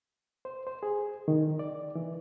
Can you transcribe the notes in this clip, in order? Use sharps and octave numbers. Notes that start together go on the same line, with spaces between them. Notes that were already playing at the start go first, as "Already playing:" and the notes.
C5
C5
G#4
D#3
D5
E3